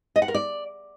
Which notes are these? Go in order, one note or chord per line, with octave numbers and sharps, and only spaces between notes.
D#5
F#5
A#4
D5